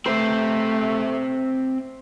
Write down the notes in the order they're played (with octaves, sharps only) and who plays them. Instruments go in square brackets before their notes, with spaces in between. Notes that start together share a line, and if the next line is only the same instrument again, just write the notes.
[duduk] A3 [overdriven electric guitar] C4 E5 [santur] C5